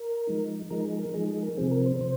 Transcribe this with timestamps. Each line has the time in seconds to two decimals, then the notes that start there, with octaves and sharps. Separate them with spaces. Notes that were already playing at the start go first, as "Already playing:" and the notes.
Already playing: A#4
0.27 F3 G#3 D#4
0.70 F3 G#3 D#4 A#4
0.85 G#4
0.99 A#4
1.14 F3 G#3 D#4 G#4
1.28 G#4
1.43 A#4
1.57 C3 F3 C4 G#4
1.71 A#4
1.86 C5
2.01 C3 C5